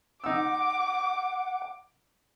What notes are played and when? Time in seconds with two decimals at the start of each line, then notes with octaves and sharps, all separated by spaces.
0.24 D#4 F#5 D6 E6